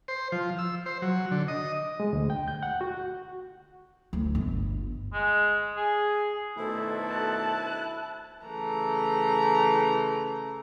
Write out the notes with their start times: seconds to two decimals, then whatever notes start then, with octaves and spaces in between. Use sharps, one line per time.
0.08 C5
0.32 F3
0.59 E6
0.86 C5
1.02 F#3
1.31 D3
1.48 D#5
2.00 G#3
2.13 D2
2.30 G5
2.48 G6
2.63 F#5
2.81 F#4
4.13 D2
4.35 G1
5.13 G#3
5.77 G#4
6.57 B2 D#3 A3 D4 E4 A4 C5
7.08 A5 F#6
8.45 C#3 E3 A3 A#5